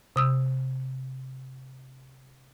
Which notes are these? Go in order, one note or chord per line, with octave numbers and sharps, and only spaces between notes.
C3 D#6 E6